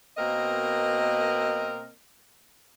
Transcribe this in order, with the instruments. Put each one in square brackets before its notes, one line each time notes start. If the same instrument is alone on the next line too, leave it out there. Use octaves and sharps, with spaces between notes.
[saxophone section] B2 A#3 C4 A#4 D#5